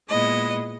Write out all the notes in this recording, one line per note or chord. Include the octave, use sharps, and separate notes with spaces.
A#2 G#3 B3 E4 D#5